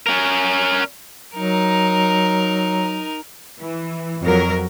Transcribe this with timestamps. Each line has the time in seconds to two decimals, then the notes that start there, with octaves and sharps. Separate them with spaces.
0.06 C#4 A#4
1.36 F#3 D#4 A#4
3.59 E3
4.24 F2 F#3 A#4